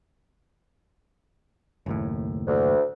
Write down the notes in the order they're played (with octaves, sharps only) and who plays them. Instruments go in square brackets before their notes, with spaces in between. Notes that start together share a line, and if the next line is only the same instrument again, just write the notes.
[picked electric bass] F#1 D#2 A2
[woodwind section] D2